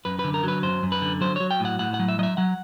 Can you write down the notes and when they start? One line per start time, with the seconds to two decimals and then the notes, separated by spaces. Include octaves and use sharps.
0.05 F#2 B4
0.19 D3 B4
0.34 A#4
0.44 F#3 B4
0.63 F#2 C5
0.83 F#2
0.92 B4
1.02 D3
1.21 F#3 C5
1.36 F#3 C#5
1.51 G5
1.60 A2 F#5
1.79 A2 F#5
1.94 F#5
1.99 F#3
2.08 E5
2.19 F#3 D#5
2.23 E5
2.37 F#3 F#5